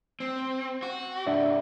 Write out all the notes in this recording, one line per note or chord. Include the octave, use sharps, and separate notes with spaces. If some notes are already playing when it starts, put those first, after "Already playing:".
C4
F#4
C2 G2 D4 D5 E5